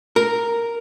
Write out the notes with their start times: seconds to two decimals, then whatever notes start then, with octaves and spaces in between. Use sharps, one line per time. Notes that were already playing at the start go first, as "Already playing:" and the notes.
0.16 A#4